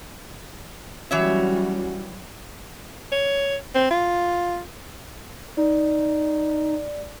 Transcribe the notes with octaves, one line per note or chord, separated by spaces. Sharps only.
E3 F#3 G3 C#4 F#4 C#5 E5
C#5
C4
F4
D#4 D5